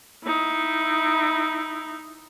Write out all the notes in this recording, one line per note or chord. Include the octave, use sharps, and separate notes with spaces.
D#4 E4